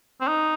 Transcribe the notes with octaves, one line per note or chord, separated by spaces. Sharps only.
C4
D#4